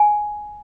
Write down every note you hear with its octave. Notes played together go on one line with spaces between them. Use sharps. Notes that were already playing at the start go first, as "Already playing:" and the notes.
Already playing: G#5